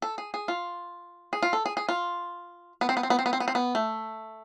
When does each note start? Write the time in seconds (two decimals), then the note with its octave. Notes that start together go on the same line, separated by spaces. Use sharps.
0.02 A4
0.18 G#4
0.34 G#4
0.48 F4
1.33 G#4
1.42 F4
1.53 A4
1.66 G#4
1.77 G#4
1.89 F4
2.81 B3
2.89 C4
2.97 B3
3.03 C4
3.10 B3
3.19 C4
3.26 B3
3.33 C4
3.40 B3
3.48 C4
3.55 B3
3.75 A3